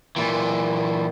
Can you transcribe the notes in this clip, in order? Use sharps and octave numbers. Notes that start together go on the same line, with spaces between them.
A#2 E3